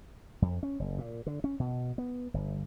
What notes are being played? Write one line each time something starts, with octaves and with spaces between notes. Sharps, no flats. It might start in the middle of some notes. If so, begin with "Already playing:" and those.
F2
C#4
F#1
A#2
D3
C#4
B2
B3
G1